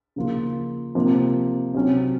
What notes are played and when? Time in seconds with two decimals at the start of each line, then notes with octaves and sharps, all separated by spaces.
0.16 C#3 F3 A#3 F4
0.95 C3 F3 A#3
1.74 C3 F#3 C#4